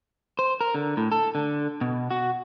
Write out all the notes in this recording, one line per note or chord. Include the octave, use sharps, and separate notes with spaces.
C5
A#4
D3
A2
A4
D3
B2
F#4